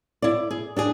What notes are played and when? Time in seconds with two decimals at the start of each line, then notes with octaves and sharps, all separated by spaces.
0.22 E4 D5
0.51 G#4
0.76 D4 G4 G#4